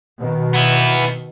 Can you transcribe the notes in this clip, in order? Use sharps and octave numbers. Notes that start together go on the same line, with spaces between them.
B2 D#3
B3 E4